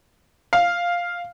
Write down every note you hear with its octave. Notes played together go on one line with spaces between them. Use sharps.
F5